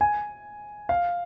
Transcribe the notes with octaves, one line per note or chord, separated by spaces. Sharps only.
G#5
F5